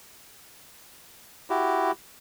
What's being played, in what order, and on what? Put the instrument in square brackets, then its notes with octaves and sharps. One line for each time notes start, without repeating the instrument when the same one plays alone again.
[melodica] E4 F#4 G4